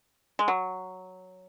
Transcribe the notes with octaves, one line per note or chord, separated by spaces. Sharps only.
G#3
F#3